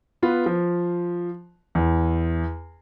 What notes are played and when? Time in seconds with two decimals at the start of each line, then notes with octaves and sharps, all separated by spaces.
0.22 B3 F4 B4
0.46 F3
1.75 E2